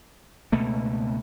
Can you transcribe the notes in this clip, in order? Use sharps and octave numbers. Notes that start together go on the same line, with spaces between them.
C#2 B2 A3 A#3